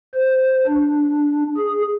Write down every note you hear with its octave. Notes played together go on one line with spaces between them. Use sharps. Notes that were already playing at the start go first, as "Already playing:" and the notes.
C5
D4
G#4